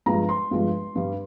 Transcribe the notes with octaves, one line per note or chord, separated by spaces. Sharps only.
G2 F3 G#3 A#5
C6
G2 F3 G#3
G2 G3